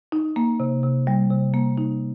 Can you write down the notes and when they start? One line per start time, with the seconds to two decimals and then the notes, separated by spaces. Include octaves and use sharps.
0.12 D#4
0.36 A#3
0.60 C3
0.83 C3
1.07 G3
1.30 C3
1.54 A#3
1.78 D#4